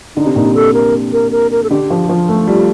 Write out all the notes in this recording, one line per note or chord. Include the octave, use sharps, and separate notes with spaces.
D3 D#4
C3
A#2 D#4
C3
A4
A#4
A#4
A#4
A#4
A4
D3 G4
F3
F3 F4
A3
G3 F4